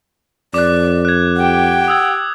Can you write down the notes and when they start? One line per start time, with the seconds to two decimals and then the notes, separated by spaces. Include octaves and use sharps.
0.54 F2 D5 D6 F#6
1.05 F#6 G#6
1.37 G4 F#5 G5
1.88 D#6 E6 G#6